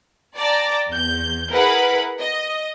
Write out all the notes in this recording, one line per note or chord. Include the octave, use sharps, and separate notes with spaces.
D5 G5 A5 A#5 D6 A6
E2 G6
E4 G#4 A#4 B4 F#5 B5
D#5